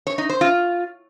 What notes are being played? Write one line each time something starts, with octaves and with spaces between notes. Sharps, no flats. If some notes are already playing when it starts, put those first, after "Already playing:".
C#5
D#4
C5
F4